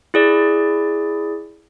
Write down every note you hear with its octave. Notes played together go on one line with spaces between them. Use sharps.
E4 G#4 D5